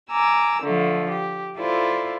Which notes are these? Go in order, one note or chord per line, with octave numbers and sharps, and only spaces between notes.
G#5 A#5 D6 E6
D3 F3 A3
G4
E4 F4 A4 C5 D5